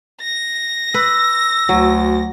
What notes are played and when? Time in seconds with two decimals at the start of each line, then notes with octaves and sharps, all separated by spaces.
0.22 A#6
0.94 B4 E6
1.69 D2 F#3